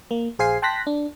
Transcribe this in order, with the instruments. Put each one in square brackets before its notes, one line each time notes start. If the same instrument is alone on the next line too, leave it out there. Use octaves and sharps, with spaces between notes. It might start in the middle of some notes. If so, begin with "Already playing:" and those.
[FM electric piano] A#3
A#1 G#4 C5 F5 G#5 C7
G5 A5 C6 F#6 A#6 B6
D4